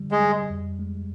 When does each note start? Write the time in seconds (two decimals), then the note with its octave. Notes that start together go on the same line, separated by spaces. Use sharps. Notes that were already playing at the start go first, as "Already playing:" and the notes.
Already playing: D3 G3
0.11 G#3
0.21 G3
0.50 F2
0.79 G#3